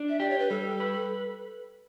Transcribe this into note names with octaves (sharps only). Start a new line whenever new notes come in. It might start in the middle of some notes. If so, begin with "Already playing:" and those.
Already playing: D4
E5
G4 D5
C#5
B4
G3 A4
B4